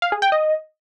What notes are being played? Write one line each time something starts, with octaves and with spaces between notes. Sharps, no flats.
F5
G#4
G5
D#5